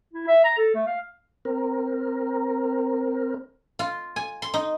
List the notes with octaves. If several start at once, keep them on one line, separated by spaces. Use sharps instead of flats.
E4
E5
A#5
A4
A3
F5
C4 A#4
F4
G#5
C6
D#4